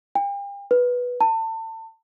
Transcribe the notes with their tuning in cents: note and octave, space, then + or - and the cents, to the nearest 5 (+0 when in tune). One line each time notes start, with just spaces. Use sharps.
G5 +40
B4 -5
A5 +30